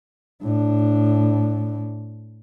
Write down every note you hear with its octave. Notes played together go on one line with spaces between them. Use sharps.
A2 D4